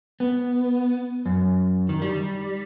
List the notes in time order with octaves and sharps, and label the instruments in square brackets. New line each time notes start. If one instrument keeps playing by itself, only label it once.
[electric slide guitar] B3
F#2
D#3
G3